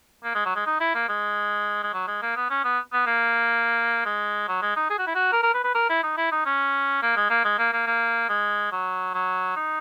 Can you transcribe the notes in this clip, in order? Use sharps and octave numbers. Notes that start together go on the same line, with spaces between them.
A#3
G#3
F#3
G#3
D#4
E4
A#3
G#3
G#3
F#3
G#3
A#3
B3
C#4
B3
B3
A#3
G#3
F#3
G#3
D#4
G#4
F#4
E4
F#4
A#4
A#4
B4
B4
A#4
E4
D#4
E4
D#4
C#4
A#3
G#3
A#3
G#3
A#3
A#3
A#3
G#3
F#3
F#3
D#4